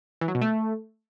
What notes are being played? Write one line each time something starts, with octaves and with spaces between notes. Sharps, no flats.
E3
F#3
B2
A3